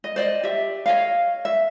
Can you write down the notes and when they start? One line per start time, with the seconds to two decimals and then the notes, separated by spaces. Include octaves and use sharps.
0.04 D#5
0.16 C5 D5 D#5
0.43 G4 E5
0.86 C#5 D#5 F5
1.45 E5